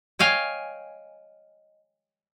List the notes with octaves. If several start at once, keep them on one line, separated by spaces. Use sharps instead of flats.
C#5 D#5 F5 G5 G#5